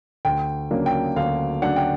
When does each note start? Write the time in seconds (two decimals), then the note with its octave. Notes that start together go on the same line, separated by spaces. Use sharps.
0.25 D2 G5
0.71 C#3 F#3 A#3 D4
0.86 G5
1.16 D2 F5
1.62 C#3 F#3 A#3 D4 F#5
1.76 G5